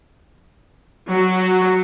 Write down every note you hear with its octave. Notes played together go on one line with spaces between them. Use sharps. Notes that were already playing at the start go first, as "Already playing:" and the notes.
F#3 F#4